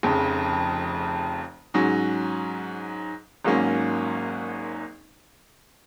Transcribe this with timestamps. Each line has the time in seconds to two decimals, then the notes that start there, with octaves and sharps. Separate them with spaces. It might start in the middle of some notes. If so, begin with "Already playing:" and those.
0.03 F1 F2 C#3
1.74 G#2 F#3 C#4
3.44 G#1 G#2 F#3 A#3 C#4